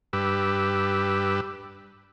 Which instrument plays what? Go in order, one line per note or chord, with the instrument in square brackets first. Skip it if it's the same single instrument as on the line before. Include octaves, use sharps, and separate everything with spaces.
[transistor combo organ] G2 G4 B4 E6